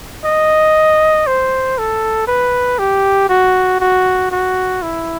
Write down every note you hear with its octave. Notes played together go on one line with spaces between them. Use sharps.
D#5
C5
A4
B4
G4
F#4
F#4
F#4
E4